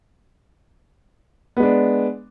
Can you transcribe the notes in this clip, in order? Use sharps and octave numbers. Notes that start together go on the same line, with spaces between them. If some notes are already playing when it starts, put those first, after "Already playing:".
G#3 B3 D4